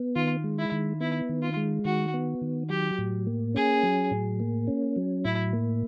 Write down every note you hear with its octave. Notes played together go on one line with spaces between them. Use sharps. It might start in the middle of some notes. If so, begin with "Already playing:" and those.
Already playing: B3
D#3 F4
G#3
E4
D#3
B3 E4
D#3
F4
G#3
D#3 F#4
B3
D#3
F#3 G4
A2
A#3
C#4 G#4
F#3
A2
A#3
C#4
F#3
A2 E4
A#3